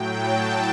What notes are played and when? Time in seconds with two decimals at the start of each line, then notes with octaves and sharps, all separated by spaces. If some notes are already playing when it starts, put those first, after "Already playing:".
Already playing: A2 F#3 G5
0.17 A5